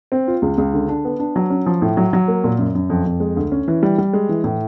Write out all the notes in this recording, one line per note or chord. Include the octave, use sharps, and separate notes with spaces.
C4
F4
C#2
C#2
D3
D4
B3
D4
F#3
C#4
F3
A2
F#3
F#3
A#3
A#2
F#2
F#2
F2
F2
G#3
D2
C#4
E3
G3
G3
G#3
E3
A2